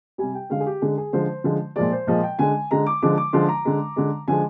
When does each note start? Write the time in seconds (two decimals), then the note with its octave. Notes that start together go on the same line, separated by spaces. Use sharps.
0.18 C3 G3 G#5
0.35 G5
0.50 D3 G#3 F5
0.60 G#4
0.66 G4
0.82 D3 G#3 G#4
0.98 G#4
1.13 D3 F3 G#3 C5
1.44 D3 F3 G#3
1.76 A#2 F3 G#3 D5
1.92 C5
2.07 A#2 F3 G#3 D#5
2.23 G5
2.39 D3 G#3 G#5
2.71 D3 G#3 A#5
2.86 D6
3.02 D3 F3 G#3 D6
3.18 D6
3.33 D3 F3 G#3 C6
3.49 A#5
3.65 D3 G#3
3.96 D3 G#3
4.28 D3 F3 G#3 G#5